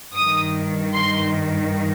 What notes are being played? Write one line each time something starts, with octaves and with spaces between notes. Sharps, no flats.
G2 D#3 D#6
C6